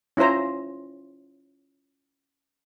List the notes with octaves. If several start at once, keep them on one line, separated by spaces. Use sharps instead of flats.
C#4 E4 F4 C5 A#5